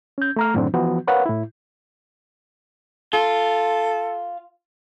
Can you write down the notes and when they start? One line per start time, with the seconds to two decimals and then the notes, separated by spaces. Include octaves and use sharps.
0.18 C#4 G6
0.36 A3 A#5 F6
0.54 F#2 A2 D#3 F#3 C4 D4
0.74 E3 F3 B3 F#4
1.07 A#4 B4 C#5 F5 F#5
1.26 A2 E4
3.13 F4 A4